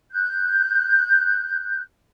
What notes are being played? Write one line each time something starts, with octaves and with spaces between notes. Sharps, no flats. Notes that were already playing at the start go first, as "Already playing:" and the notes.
F#6 G6